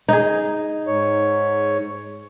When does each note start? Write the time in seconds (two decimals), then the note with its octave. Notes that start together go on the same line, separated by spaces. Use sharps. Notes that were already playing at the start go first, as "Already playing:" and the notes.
0.08 D#4 G#4
0.87 G#2 C#5